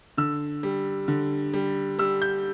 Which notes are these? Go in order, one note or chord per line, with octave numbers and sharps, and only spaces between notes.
D3 E6
G3
D3
G3
G3 E6
G6